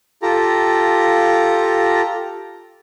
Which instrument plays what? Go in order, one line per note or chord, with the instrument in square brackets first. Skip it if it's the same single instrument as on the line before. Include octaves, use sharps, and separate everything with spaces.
[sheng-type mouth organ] F4 G4 A4 A#5